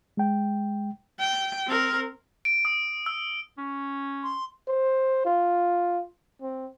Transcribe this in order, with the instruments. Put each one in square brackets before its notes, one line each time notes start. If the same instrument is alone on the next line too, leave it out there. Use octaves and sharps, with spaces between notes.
[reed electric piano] G#3 G5
[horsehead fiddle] G5
C4 A#4
[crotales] D7
D#6
E6
[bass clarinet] C#4
[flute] C6
[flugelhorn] C5
F4
C4